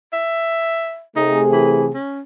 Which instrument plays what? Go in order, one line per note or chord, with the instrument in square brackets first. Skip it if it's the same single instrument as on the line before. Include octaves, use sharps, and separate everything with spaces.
[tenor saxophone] E5
[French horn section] C3 A3 G#4 [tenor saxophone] D#4
[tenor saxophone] E3
C#4